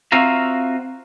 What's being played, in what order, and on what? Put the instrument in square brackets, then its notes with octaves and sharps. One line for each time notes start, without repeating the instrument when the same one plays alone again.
[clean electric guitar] C4 F4 F#4 E5 F5 A#5